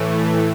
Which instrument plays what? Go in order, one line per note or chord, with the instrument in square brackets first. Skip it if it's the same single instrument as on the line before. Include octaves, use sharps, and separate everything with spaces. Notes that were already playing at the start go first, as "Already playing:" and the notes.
Already playing: [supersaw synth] A2 E3 A3